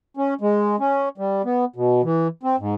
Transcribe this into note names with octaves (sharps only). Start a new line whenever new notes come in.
C#4
G#3
C#4
G3
B3
B2
E3
C4
G#2